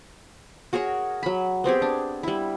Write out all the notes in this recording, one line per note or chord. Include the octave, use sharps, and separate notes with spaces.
F#4 G#4 A#4 C#5
F#3 B5
B3 C4 G4 G#4
D4
G3 E4